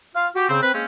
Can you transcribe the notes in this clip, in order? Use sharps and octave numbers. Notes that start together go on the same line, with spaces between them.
F4 F5
F#4 G4
C#3 C4
C4 B4
G#3 A#3 C4 C#4